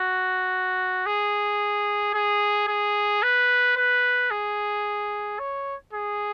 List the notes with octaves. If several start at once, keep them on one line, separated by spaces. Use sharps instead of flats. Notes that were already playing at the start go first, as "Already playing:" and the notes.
Already playing: F#4
G#4
G#4
G#4
B4
B4
G#4
C#5
G#4